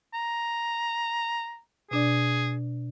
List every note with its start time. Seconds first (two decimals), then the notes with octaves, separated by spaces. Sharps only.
0.14 A#5
1.91 B2 D4 G#4 D5